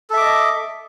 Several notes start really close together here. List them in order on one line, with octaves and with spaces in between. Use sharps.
A4 E5 D6 D#5